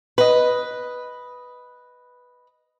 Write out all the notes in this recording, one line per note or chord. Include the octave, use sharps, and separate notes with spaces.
B4 D#5